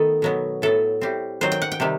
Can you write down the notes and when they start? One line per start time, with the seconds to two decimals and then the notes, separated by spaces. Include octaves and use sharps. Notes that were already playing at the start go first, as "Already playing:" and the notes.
Already playing: D#3 A3 B3 A4
0.22 B2 F#3 B3
0.62 A2 F#3 B3 A4
1.01 A2 G3 C4
1.41 D#3 F#3 C4 C5
1.52 G5
1.62 F#5
1.72 G5
1.80 C3 D#3 G3